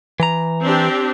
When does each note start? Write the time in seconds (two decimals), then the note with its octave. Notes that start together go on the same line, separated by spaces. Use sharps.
0.20 E3 A#5
0.63 C4 D4 G4